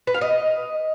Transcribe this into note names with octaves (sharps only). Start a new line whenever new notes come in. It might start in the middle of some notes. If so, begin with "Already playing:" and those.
B4
F5
D#5